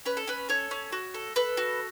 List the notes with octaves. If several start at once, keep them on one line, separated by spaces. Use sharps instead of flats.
C#4 B4
A4
C#4 B4
A4 C#5
C#4
F#4
A4
A4 B4
F#4